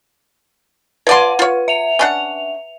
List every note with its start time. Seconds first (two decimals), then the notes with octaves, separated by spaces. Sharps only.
1.07 F3 B4 D5 F#5 C6
1.39 F4 C#5
1.68 E5 F7
1.99 C#4 D4 F#5